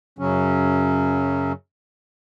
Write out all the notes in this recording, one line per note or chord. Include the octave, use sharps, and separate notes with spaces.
F#2 C#3 F#3 C#4